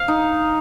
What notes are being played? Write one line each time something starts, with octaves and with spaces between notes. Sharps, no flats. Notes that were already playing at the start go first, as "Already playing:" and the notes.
Already playing: F5
D#4